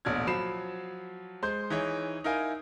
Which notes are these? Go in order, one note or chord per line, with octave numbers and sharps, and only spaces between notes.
D#1 A1 B2 D4 F6 G#6
F3 F#3 B5 C7 E7
G#3 C5 C6 G6
E3 D#4 E4 G#4 C#5
D#4 E4 A#4 F5 G#5